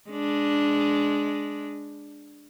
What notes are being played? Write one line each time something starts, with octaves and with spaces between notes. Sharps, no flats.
G#3 D4